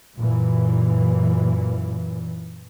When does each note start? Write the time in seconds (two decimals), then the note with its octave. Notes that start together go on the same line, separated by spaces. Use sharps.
0.17 F#2 A#2 E3